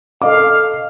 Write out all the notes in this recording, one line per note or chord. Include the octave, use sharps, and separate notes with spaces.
A4 D#5 F5 D6